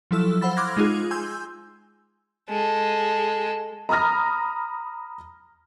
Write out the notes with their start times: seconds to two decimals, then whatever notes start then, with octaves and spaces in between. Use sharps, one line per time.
0.11 F3 F#3 E4 A4 E6
0.41 C5 F5 F#5 B5 E6 A6
0.57 C6 D6 F6 F#6 G#6 A#6
0.77 G#3 D#4 F4 G#4
1.11 G#5 C6 E6 G6
2.50 G#3 A4
3.89 A#5 B5 D#6 F6 A#6